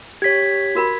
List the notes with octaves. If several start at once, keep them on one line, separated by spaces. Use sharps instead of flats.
G4 C#5 G#6 B6
F#4 A#4 B5